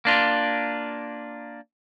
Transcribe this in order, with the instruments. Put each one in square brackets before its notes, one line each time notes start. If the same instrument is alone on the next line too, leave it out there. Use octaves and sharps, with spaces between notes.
[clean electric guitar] A#3 D4 F4